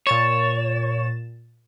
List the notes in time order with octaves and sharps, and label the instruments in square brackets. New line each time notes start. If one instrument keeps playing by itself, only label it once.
[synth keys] A#2 A6 E7 [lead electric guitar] C#5